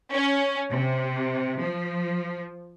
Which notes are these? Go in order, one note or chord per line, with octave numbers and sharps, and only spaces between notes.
C#4
C3
F3